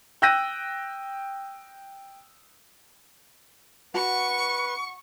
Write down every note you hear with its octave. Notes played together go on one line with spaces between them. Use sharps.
G5 E6 F#6 G6 A#6 D#7
F#4 B4 F#5 A5 C#6